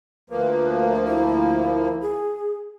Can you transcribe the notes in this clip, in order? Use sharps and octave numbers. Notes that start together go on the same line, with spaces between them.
D2 F3 A#3 B4
E4
G#4